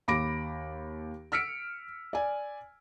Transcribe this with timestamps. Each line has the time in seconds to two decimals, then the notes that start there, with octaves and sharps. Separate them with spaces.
0.08 D#2 B5 D6 A#6 D7
1.32 E6 F6 B6 C#7 D7
2.13 D5 G#5